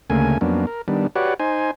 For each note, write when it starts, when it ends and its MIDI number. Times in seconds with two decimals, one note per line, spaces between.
0.10 0.38 38
0.10 0.38 49
0.10 0.38 57
0.10 0.38 58
0.10 0.38 80
0.41 0.66 41
0.41 0.66 54
0.41 0.66 58
0.41 0.66 59
0.41 0.66 61
0.41 0.66 62
0.67 0.82 70
0.88 1.07 51
0.88 1.07 55
0.88 1.07 59
0.88 1.07 62
1.16 1.34 66
1.16 1.34 67
1.16 1.34 71
1.16 1.34 73
1.16 1.34 74
1.16 1.34 78
1.40 1.71 63
1.40 1.71 72
1.40 1.71 80